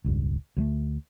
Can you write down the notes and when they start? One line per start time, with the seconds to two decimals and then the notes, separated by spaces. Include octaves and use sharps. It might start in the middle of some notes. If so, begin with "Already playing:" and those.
0.04 E1 C#2 G2
0.57 D2 F#3 A3